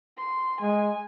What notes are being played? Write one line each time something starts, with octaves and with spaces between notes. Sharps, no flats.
C6
G#3 G#5